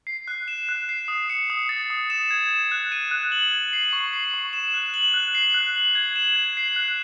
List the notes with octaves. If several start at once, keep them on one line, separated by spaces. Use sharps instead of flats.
C7
F#6
E7
F#6
C7
D#6
C#7
D#6
A6
D#6
E7
G#6
E7
F#6
D#7
F#6
F#7
G#6
C7
C#6
C7
C#6
E7
F#6
F#7
F#6
C7
F#6
F#7
G#6
E7
G#6
C7
F#6